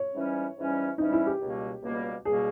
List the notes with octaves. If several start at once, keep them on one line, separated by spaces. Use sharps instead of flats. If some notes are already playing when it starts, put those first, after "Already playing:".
Already playing: C#5
G#2 E3 G3 C#4
G#2 E3 G3 C#4
G#2 E3 G3 C#4 D#4
E4
G4
C#2 B2 G3 A#3
C#2 B2 G3 A#3
C#2 B2 G3 A#3 G#4